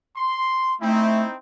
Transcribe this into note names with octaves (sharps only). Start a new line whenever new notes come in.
C6
A3 C4 D#4 E4